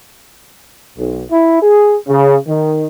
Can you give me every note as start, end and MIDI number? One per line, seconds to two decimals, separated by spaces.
0.97 1.23 35
1.31 1.58 64
1.62 1.97 68
2.07 2.36 49
2.47 2.88 51